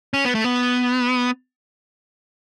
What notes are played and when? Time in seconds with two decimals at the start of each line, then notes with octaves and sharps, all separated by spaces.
0.14 C#4
0.25 B3
0.35 A3
0.44 B3